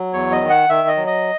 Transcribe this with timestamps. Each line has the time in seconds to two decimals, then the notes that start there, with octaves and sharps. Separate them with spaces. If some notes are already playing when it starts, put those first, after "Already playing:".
Already playing: F#3
0.13 E2 C#5
0.32 D#5
0.41 D#3
0.49 F#5
0.69 D#3 E5
0.88 D#5
0.96 F#3
1.07 D#5